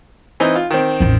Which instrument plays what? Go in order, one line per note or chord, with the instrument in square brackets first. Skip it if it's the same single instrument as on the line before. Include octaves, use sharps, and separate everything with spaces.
[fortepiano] E3 C4 D#4
F4
D#3 C4
[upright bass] A1 E2